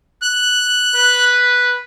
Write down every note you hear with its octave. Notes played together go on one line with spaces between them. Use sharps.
F#6
B4